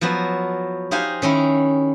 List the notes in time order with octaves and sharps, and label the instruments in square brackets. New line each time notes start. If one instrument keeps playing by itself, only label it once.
[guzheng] F3 F#3 B3 F#4
D#4 G4 C5 F5 F#5 G#5
D#3 C#4 E4